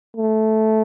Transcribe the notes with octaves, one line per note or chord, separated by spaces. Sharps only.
A3